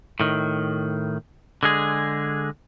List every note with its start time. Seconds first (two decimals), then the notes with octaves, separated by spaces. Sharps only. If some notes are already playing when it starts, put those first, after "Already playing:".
0.20 A2 D#3
1.63 D3 G#3 G#4